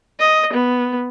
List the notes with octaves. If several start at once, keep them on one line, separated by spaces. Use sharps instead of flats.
D#5
B3